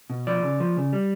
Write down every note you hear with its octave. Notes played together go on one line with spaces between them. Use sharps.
B2
F3 D5
C#3
F3
C#3
G3